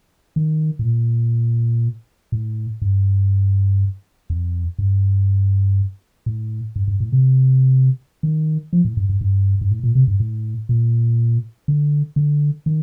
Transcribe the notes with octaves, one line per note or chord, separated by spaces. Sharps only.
D#3
A2
A#2
A2
G2
F2
G2
A2
G2
G2
A2
C3
D#3
F3
A2
G2
G2
G2
G2
A2
A#2
C3
G2
A2
A#2
D3
D3
D#3